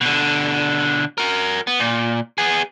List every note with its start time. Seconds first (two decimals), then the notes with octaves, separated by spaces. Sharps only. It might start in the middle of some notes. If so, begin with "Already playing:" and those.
0.01 B2 D3
1.18 F#4 A#4
1.67 B3
1.80 A#2
2.38 B3 G#4